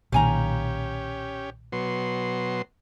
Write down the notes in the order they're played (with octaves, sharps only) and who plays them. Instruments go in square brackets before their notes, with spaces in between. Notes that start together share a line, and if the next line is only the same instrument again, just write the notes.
[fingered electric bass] B1 A#2 D#3 [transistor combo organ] C#4 G4 [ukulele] F5 G#5 A#5
[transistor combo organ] B2 F#3 C6